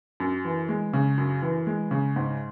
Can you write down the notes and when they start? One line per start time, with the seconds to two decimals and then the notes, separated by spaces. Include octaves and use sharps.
0.20 F#2
0.45 E3
0.69 G#3
0.93 C#3
1.18 F#2
1.42 E3
1.67 G#3
1.91 C#3
2.16 G#2